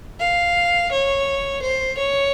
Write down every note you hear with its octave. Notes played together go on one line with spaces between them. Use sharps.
F5
C#5
C5
C#5